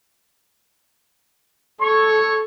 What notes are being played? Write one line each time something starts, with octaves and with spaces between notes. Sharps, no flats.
A4 C#5 C#6